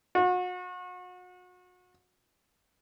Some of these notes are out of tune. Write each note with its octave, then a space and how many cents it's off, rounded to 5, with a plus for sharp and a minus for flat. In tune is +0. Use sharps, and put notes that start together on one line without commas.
F#4 -35